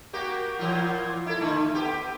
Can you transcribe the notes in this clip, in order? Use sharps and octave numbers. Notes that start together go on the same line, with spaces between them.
A#3 F#4 G4
A#2 E3 F4
E4 A4
D3 A3
B3 G4